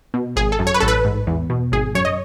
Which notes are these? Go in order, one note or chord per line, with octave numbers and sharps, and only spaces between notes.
B2
G#1 G#4
A4
F#2
C#5
B4
A1 A4
B4
G#2
E2
B2
G#1 G#4
F#2 C#5
D#5